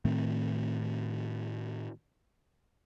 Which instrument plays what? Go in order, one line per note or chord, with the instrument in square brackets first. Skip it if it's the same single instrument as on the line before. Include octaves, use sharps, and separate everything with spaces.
[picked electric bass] A2 D#3 A3 C4